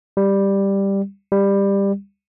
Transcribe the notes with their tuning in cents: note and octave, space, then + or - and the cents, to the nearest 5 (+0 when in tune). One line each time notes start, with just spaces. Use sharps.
G3 +5
G3 +15